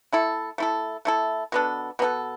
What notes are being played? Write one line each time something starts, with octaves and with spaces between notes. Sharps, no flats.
A3 E4 A4
A3 E4 A4
A3 E4 A4
B2 B3 D4 A4
B2 B3 D4 A4